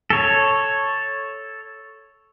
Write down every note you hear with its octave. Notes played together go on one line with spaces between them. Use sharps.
A4 C#5